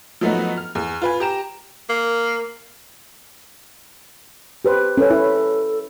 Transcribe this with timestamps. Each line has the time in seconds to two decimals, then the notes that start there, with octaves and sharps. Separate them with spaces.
0.21 F3 F#3 A3 B3 D#4 F#4
0.57 F6
0.75 E2
1.02 F4 B4 G#5
1.20 G4 A#5 E7
1.89 A#3
4.65 G4 B4 C5
4.97 C#4 A4 B4 C#5
5.10 E4